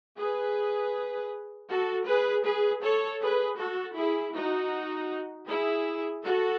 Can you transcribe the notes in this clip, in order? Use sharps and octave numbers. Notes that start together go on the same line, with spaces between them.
G#4 B4
F#4 A4
G#4 B4
G#4 B4
A4 C#5
G#4 B4
F#4 A4
E4 G#4
D#4 F#4
E4 G#4
F#4 A4